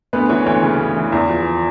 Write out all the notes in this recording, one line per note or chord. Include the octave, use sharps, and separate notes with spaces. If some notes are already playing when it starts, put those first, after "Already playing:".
D2 B3 B4
E3 C#4 C#5
D2 C#4 C#5
C#3
D2
E3
E2
F3